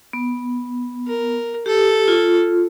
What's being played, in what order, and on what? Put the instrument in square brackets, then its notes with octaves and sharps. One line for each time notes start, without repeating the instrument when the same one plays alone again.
[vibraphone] B3
[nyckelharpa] A#4
[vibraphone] G4 [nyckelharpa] A4
[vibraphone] F4